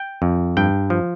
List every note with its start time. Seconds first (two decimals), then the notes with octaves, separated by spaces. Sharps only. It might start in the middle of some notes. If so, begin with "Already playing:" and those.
Already playing: G5
0.22 F2
0.57 G2 G5
0.90 F3